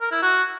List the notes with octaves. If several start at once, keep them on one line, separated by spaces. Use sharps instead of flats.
A#4
E4
F#4